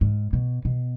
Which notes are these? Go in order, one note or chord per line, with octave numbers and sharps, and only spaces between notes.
G#2
B2
B2